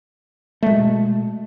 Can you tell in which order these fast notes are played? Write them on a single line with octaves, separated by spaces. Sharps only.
A3 G#3 B2